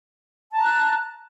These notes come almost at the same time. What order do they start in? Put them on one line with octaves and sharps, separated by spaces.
A5 A#5 F#6